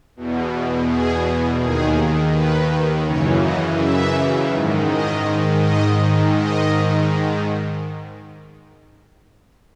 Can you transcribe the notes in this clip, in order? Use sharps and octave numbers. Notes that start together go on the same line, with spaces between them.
E2 B2
G#4
D#2 D#3 G#4
B4
F#2 C#3 E3 C#5
D#5
E5
G#2 D#3
D#5
D#5
G#2 D#3
D#5